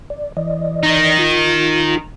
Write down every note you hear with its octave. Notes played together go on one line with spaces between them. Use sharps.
D5
E3 D5 D#5
D#3 D#4
F4